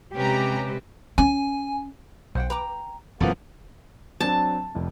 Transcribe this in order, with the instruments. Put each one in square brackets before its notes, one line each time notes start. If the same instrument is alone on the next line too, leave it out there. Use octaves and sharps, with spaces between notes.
[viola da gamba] C3 [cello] G#3 B4 [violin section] C#4 A#5 [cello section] G4
[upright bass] C#4 [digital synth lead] G#5
[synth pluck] B1 [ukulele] C5 F#5 G5
[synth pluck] B4 D6 [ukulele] G5 A#5
[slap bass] E1 F#2 E3 [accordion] F3 A#3 B3 [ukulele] A4
[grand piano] F#3 C4 D4 [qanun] A5
[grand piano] F1 F2 C3